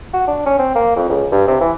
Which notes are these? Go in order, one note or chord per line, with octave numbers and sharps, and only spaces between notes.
F#4
D4
C#4
C4
A#3
F2
C#2
G2
C3
E3